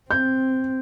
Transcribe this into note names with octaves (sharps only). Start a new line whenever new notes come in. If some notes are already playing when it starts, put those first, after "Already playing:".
C4 G6